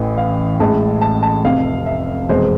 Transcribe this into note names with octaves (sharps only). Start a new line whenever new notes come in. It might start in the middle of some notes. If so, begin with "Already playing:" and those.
Already playing: A1 A2 E3 A3
F5
A1 A2 G#3 A5
A5
A5
F1 F2 C3 F5
E5
F1 E2 B2 G#3 C5